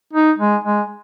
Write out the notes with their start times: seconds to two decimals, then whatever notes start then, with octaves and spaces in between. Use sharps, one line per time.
0.14 D#4
0.39 G#3
0.64 G#3